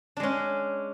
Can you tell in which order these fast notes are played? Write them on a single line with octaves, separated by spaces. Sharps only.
D4 G#3 C#4